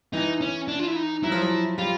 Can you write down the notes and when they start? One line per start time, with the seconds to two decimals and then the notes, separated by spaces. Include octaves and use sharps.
0.13 E3 D#4
0.41 C#4
0.68 D4
0.79 F4
0.87 E4
0.96 D#4
1.23 F#3 E4
1.32 F3
1.42 F#3
1.78 G3 F4